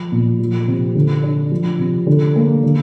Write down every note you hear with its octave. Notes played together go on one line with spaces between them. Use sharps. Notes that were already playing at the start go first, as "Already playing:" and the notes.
Already playing: F3
A#2
F3
C3
D3
D4
F3
C3
D3
A#3
D3